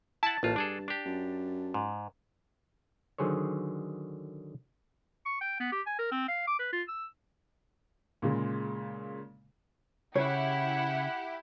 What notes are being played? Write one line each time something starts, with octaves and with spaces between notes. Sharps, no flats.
E4 F#5 A5
A1 A#2 F4
G2 D4 G#4 A4
D4 G4
F#2
G#2
D3 D#3 F#3 G#4 C5 C#5
C#6
G5
B3
G4
G#5
A#4
C4
F5
D6
B4
F4
E6
A#2 C#3 G#3
C#3 E4 G4 C#5 F#5